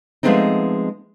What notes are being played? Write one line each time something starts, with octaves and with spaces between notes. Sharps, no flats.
F3 G#3 A3 B3 C4 D#4